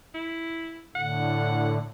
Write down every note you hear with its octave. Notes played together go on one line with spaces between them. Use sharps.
E4
A2 D3 F#5